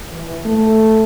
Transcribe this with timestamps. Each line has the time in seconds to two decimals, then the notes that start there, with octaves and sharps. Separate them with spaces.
0.12 E3
0.45 A3